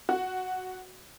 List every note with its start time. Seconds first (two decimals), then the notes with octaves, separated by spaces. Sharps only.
0.09 F#4